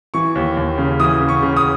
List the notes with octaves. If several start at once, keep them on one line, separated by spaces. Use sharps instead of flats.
E3 C#6
D#2
D#2
C#3
E3 D#6
C#3
C#6
C#3
D#6